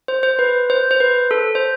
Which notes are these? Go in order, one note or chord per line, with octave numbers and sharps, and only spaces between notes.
C5
C5
B4
C5
C5
B4
A4
C5